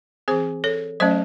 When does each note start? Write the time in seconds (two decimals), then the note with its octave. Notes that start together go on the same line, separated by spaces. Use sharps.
0.28 E3 C4 G#4 C5
0.64 A4 C#5
1.00 F#3 A3 C#4 C5 D#5